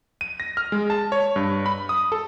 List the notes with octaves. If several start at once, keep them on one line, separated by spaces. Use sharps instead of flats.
D#7
A#6
F6
G#3
A5
C#5
G2
B5
D#6
A4